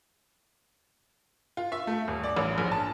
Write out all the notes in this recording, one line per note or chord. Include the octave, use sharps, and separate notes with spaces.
F4
E5
A3
D#1
D5
A1
A#1
A5